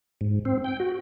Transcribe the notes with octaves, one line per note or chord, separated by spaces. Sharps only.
G#2
C4
G5
F#4